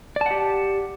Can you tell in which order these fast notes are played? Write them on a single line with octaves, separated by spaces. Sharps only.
D5 A5 F#5 G4